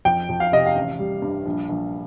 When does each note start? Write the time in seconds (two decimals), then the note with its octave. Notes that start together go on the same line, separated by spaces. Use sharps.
0.05 F2 G5
0.29 F2
0.40 F5
0.52 C3 D#5
0.66 F5
0.75 A1
0.99 G3
1.22 G2
1.46 A#1
1.69 A#1